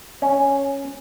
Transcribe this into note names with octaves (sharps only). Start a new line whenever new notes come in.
C#4